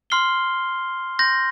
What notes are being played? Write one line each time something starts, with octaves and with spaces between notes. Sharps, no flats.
C6 F6 C7 G7
C6 G6 A#6